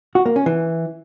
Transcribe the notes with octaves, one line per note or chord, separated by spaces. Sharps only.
F#4
A#3
C#4
E3